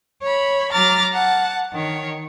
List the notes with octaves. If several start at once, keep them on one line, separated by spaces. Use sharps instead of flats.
C#5 B5
F#3 A#5 D6 F6 A6
F#5 A5
D#3 C#5